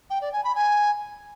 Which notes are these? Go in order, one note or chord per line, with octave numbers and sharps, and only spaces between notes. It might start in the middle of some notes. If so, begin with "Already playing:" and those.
G5
D5
G#5
B5
G#5